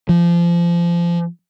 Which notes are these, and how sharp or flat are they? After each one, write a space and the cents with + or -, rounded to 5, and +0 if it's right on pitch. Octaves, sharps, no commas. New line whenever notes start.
F3 -25